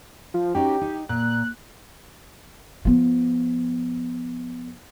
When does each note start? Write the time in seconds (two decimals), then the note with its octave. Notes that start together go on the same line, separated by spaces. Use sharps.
0.34 F3
0.55 C#4 D#4 F#4 G4
0.81 D#4
1.09 A#2 F#6
2.85 F3 B3